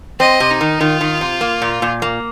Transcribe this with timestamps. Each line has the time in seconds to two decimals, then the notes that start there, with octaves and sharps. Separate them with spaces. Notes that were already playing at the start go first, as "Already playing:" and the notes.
0.20 C4 D#5
0.40 C3
0.51 D#4
0.61 D#3
0.80 D#3 F4
1.01 D#3
1.21 C3
1.41 A#3
1.62 A#2
1.82 A#2
2.02 A#3